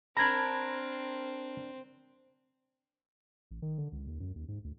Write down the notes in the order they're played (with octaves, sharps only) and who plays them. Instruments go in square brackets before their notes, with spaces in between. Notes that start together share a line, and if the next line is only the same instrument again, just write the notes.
[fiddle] C4 [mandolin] D4 A#4 A#5 [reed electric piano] B5 G#6
[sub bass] A1
D#3
D3
C#2
D#2
F#2
D#2
G#2
D2